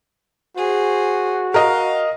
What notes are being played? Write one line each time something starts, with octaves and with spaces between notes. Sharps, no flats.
F#4 G#4 C5
A#4 D#5 F5